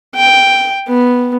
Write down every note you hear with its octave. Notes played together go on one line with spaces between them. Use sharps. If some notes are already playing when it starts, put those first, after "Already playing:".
G5
B3